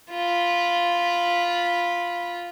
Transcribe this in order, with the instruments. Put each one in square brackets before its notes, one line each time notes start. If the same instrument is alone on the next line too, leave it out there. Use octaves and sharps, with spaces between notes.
[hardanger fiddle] F4 B5